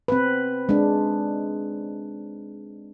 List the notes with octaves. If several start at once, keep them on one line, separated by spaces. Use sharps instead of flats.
C4 B4
G#3 D4